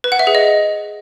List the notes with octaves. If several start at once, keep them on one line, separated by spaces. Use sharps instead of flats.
B4
F#5
E5
G#4
D#5